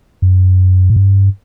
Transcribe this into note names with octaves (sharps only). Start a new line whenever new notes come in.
F#2
A2
G2